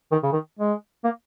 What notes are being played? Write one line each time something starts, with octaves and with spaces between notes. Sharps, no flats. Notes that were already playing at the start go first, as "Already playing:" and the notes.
D#3
C#3
D#3
G#3
A#3